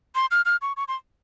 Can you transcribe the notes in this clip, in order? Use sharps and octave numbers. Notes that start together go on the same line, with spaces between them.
C6
F6
F6
C#6
C#6
C6